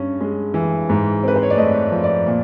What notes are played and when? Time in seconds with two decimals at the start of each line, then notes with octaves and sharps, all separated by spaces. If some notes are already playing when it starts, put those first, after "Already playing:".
Already playing: G2 C#4
0.21 G#3
0.54 E3
0.89 G#2
1.24 C4 B4
1.36 C5
1.43 C#5
1.50 D5
1.57 A3 D#5
1.92 F3
2.04 D5
2.27 A#2